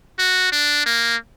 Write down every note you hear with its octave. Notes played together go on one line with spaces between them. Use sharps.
F#4
D4
A#3